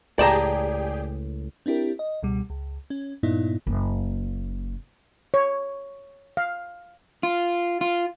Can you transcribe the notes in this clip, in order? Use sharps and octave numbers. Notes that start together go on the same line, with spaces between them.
C#2 A2 G4 G#4 D5 G5 A5 A#5
C4 D4 E4 G4 A#4
D#5
C#2 B2 G3
C#2
C#4
G2 A#2 B3 D#4 E4
F#1 A#3
C#5
F5
F4
F4